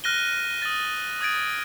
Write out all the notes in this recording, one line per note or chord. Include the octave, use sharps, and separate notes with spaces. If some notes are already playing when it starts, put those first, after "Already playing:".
F6 F#6 A#6 D#7 G7
D#6 A6
D#6 G#6 A6 D7